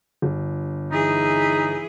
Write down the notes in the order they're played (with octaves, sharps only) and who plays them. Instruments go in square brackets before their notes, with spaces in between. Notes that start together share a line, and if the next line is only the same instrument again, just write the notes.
[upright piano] G1
[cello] E3 G#4 [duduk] D#4